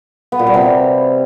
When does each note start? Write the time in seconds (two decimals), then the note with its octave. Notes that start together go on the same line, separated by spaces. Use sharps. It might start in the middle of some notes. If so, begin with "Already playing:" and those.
0.32 B3
0.39 A#2
0.47 G3
0.54 C3